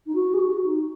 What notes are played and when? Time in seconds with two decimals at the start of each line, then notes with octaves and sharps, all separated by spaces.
0.06 D#4
0.14 F#4
0.33 G#4
0.38 F#4
0.64 D#4